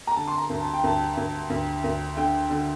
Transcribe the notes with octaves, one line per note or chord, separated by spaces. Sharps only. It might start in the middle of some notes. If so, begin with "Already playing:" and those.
A#5
D3 A5
C6
A#5
D2
A5
G5
D2 A5
D2
D2
D2
D3 G5
D3